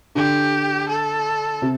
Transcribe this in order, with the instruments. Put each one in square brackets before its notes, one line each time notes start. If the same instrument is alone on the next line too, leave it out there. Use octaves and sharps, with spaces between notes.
[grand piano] D3 D4 [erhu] G4
[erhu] A4
[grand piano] C3